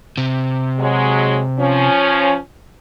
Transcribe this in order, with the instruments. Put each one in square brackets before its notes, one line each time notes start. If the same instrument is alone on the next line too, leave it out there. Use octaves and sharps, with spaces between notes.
[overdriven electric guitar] C3
[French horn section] F#3 G#3
F3 C#4